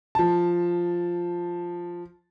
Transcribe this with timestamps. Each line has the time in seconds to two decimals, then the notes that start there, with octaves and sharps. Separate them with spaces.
0.15 F3 A5